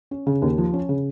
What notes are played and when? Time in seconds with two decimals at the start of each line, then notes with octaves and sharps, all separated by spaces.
0.11 C#4
0.27 C#3
0.42 D#2
0.58 F3
0.73 C#4
0.89 C#3